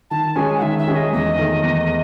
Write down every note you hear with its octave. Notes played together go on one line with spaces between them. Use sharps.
D#3 A5
G#3 C#4 G#4 G#5
F#5
D#3 E5
E5
G#3 C#4 G#4
D#5
E2 D#5
D#3 A3
E2